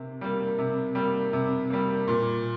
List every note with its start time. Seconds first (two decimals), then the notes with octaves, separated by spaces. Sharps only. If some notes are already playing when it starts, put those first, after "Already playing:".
Already playing: C3 A#3
0.21 G3 A#3
0.59 C3
0.95 G3 A#3
1.33 C3
1.70 G3 A#3
2.08 A#2